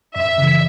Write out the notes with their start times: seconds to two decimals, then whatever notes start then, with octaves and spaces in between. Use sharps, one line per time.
0.16 F#2 E5
0.38 C#3 E3